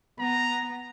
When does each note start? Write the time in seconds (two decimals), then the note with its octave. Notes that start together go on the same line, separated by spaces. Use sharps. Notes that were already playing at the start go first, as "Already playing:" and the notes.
0.19 B3 A#5